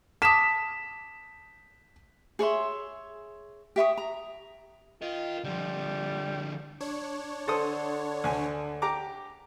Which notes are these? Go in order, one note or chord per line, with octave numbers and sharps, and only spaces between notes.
A5 D6 D#6 B6 E7
G#4 C#5 E5 C6
G4 E5 C#6 D#6
A#5
F4 A#4 D#5
D3 F3 G3
D4 C#5
D3 A4 C5 D#6
D2 G#5
G4 A#5 D6